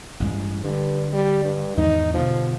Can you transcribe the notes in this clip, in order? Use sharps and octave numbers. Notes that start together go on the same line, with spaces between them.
A1 G2 G#3
G2 D3
G3
G2
E2 G#2 D#3 D#4
G2 B2 D3 F3